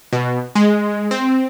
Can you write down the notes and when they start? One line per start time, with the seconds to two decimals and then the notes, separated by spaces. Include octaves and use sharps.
0.13 B2
0.55 G#3
1.11 C4